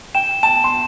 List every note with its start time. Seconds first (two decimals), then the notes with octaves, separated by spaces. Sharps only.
0.15 G5 E7
0.43 A5 E7
0.64 C6